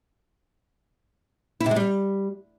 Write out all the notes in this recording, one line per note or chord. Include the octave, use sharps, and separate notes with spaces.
E4
C3
G#3
G3